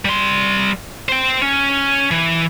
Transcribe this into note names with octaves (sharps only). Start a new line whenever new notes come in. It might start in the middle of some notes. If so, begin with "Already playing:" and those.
G3 C6
C5 G5
C#4
E3